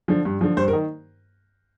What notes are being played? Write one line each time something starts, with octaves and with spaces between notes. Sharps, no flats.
D3 F3
G2
D3 F3
G2 C5
A#4
D#3